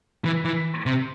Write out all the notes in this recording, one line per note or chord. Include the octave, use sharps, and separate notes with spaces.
E3
E3
C3